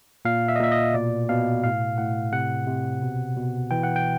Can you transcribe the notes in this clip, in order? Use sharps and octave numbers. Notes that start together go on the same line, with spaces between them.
A#2 F5
E5
D#5
A#2 E5
D#5
B2 D5
B2 F5
A2 F5
A2 F#5
C3 F#5
C3
B2
B2
E3 G5
F#5
G5